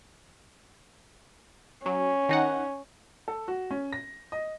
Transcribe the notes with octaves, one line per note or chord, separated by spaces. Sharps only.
F#3 C#4
D#3 D#4 F#5
A4
F#4
C#4
A#6
D#5